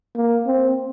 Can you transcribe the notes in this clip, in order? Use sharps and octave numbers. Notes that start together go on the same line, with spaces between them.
A#3
C4